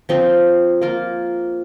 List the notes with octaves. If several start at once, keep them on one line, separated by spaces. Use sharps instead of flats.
F3 C4 D#4
A#3 F4 A#4